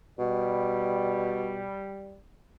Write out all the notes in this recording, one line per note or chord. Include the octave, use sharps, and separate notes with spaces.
B2 G3